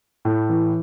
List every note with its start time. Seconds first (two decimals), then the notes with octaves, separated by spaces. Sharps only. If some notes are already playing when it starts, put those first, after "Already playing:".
0.25 A2
0.49 E3